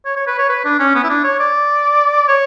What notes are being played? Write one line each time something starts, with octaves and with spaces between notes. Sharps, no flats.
C#5
C#5
B4
C#5
B4
D4
C#4
B3
E4
D4
C#5
D5
C#5